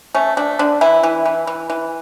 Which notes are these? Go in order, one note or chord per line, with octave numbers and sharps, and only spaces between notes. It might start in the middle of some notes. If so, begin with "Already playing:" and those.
A3 C#4
A3 D4
D3 D4
E3 E4
E3
E3
E3
E3